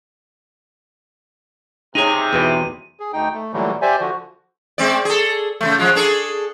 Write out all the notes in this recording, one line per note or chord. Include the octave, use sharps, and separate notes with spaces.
C3 D#4 G#4 C#5 D#7
E2 B2 E3
G#4
D2 D#4 G5
A3
A#2 D3 E3 F#3 G3 A3
G4 C5 D5 E5 G#5
D3 F3 F#4
G#3 C4 D5
G#4 A4
C#3 F3 A3
F3 G#3 F4
D4 G#4 A4